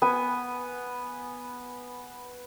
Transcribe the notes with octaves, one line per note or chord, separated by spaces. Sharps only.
B3 G#5